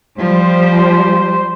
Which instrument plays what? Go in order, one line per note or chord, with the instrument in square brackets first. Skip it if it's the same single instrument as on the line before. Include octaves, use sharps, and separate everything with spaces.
[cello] F3 [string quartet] G3 [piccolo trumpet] C5